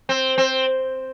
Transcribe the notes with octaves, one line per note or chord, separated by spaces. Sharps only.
C4
C4